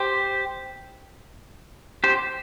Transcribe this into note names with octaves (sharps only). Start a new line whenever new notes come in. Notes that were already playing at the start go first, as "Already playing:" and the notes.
Already playing: G4 C5
G4 C5